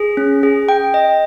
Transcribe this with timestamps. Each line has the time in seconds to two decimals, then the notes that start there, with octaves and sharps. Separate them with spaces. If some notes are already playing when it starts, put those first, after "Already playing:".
Already playing: G#4
0.17 C#4
0.43 G#4
0.69 G5
0.94 D#5